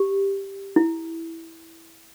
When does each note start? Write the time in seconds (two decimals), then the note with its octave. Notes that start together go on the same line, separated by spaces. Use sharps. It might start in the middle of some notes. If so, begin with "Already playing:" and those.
Already playing: G4
0.76 E4